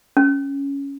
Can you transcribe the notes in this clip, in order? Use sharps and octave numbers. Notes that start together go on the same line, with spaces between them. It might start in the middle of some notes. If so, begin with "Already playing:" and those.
C#4